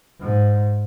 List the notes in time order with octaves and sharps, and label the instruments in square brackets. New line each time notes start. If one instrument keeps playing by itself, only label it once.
[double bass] G#2